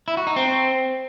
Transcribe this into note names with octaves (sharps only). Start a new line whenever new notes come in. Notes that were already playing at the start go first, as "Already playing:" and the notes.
E4
F#4
D#4
C4